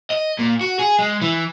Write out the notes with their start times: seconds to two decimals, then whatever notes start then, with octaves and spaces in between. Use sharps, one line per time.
0.10 D#5
0.39 A#2
0.61 F#4
0.79 G#4
0.99 G#3
1.22 E3